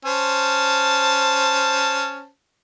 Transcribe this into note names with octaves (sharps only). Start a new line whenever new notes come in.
C#4 C5 A5